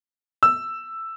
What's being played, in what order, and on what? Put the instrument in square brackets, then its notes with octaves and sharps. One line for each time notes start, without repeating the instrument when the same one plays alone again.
[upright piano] E6